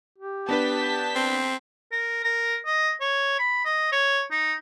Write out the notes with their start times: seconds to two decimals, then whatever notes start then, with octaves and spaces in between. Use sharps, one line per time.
0.18 G4
0.49 B3 D4 B4 A5 G6 B6
1.15 C4
1.92 A#4
2.24 A#4
2.66 D#5
3.01 C#5
3.39 B5
3.65 D#5
3.92 C#5
4.31 D#4